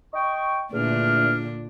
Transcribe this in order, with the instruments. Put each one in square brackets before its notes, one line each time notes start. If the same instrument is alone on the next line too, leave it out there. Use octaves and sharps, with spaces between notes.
[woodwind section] D#5 G5 C#6
[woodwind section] E2 A3 F6 [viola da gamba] A#2 D3 D4